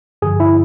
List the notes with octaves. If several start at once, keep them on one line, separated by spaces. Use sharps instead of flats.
G2 D3 F3 G#4
E4